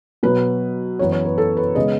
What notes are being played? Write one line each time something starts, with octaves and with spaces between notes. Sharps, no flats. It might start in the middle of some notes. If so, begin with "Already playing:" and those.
B2 F#3 B3 B4
F#2 E3 B3 C#5
C#5
B4
A4
B4
C#3 G#3 B3 D#5